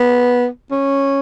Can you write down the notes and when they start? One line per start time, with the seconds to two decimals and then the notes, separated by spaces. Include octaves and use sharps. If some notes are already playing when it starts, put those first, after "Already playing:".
Already playing: B3
0.72 C#4